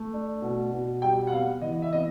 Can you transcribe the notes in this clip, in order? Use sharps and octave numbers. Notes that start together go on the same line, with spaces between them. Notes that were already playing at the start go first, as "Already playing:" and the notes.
Already playing: A3
D4
B2
B2
G3 G5
F#5
B3 F5
E3 D#5
E5
B3 D#5